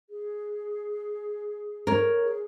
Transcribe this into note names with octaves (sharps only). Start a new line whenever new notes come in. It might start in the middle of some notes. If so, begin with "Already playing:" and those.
G#4
A#4 C#5
G#4